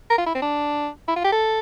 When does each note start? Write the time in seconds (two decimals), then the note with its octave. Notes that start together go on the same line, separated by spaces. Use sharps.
0.10 A#4
0.18 F4
0.26 E4
0.35 C4
0.42 D4
1.08 E4
1.16 F4
1.24 G4
1.32 A4